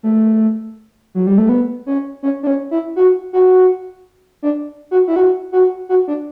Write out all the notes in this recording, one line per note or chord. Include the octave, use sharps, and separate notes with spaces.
A3
F#3
G3
A3
B3
C#4
C#4
D4
C#4
E4
F#4
F#4
D4
F#4
E4
F#4
F#4
F#4
D4